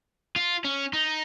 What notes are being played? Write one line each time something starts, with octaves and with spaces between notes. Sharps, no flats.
F4
C#4
D#4